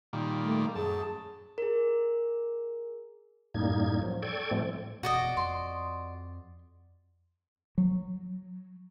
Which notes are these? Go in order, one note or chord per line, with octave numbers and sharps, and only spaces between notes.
A#2 D#3 G3
A3
F#2 G#4 A5
G#4 A#4
F#2 A2 G3 A#3 D#4 G#6
F3 F#3
A4 D5 G5 C#6 G#6
A2 F3 G3 A3 C4
F1 B2 F#4 D5 D#5
F2 C6
F#3